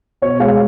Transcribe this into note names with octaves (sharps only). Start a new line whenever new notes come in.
B2 C#5
G#3 F5